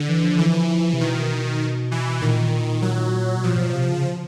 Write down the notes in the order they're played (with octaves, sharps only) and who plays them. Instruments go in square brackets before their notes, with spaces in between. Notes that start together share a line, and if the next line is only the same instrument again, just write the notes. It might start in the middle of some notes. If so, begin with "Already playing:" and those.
Already playing: [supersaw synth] D3
[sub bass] E3
F3
[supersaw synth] E3
[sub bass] C3
[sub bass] B2 [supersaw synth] D#3
[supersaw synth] E3
[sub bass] A#2 [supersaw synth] D#3
[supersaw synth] F#3
[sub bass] B2
[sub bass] A#2 [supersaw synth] F3
[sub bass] A#2
B2
C3
C#3